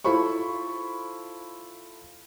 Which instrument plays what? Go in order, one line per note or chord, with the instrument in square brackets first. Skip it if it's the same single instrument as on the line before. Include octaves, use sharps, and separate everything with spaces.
[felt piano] E4 F4 A4 C5 B5 C#6